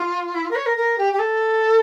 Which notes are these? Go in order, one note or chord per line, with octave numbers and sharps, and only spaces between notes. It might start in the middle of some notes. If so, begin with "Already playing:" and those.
Already playing: F4
E4
F4
A#4
C#5
A#4
A#4
G4
G4
A4